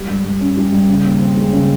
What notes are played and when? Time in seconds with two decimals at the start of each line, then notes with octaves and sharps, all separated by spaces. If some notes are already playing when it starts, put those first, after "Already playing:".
Already playing: G3
0.08 G2
0.25 G2
0.41 C#4
0.57 G3
0.72 G2
0.88 C#3
1.04 D#2
1.20 C4
1.36 G#3
1.52 C#3